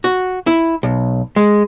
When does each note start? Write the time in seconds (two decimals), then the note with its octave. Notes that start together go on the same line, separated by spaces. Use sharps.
0.04 F#4
0.47 E4
0.83 B1
1.36 G#3